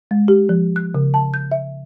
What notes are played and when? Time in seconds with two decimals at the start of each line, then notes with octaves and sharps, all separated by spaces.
0.11 G#3
0.28 G4
0.49 F3
0.76 F#6
0.95 C#3
1.14 A5
1.34 G6
1.52 E5